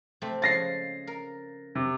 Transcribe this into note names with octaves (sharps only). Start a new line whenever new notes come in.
C3 A3 C4
C#3 F3 G#3 A6 A#6 C7
A#4
C3